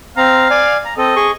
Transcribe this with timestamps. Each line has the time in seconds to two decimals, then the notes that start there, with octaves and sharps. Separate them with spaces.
0.17 C4 F5 A#5
0.50 D5 G#5
0.85 A#5
0.98 C4 A4 D#5
1.16 G#4 C#6